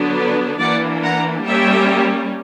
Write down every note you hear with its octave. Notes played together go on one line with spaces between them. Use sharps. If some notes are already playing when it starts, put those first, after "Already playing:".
Already playing: D3 F#3 B3 D4
B4 D5
E3 A#3 D4 D5 F#5
F#5 A#5
G3 A#3 C#4 E5 G5